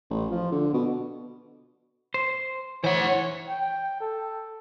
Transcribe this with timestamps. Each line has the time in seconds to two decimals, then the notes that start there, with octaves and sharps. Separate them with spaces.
0.10 A1
0.31 F3
0.52 D3
0.73 B2
2.14 C5
2.84 E3 C5 C#5 F#5
3.49 G5
4.01 A4